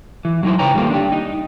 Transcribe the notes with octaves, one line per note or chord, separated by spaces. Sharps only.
E3
F#3 D#4 E4 C5
C#3 B4 C#5 G5 A#5
D#3 G3 A3 A#3 F4
D4 G4
D#4